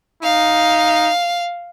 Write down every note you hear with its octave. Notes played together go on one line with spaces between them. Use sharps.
D#4 F5